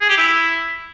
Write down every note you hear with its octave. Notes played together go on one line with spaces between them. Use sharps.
G#4
G4
E4